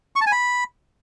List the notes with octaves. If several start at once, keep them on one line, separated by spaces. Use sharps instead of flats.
C#6
A5
G#5
B5